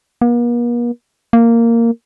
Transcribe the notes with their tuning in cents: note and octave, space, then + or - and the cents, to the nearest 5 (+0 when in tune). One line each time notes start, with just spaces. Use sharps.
A#3 +45
A#3 -10